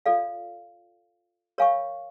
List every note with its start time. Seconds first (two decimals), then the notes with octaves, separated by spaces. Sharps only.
0.06 F4 A4 D5 F5
1.58 A#4 C#5 F5 G#5 C#6